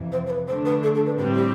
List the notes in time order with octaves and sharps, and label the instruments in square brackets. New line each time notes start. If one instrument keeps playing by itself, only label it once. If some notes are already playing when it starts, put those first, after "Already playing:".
Already playing: [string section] F2 C3 E3
[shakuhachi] C5
C5
B4
[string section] D3 A3 D4 [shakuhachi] C5
[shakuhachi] B4
A4
A4
B4
[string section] A2 G3 C4 [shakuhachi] B4
[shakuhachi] G4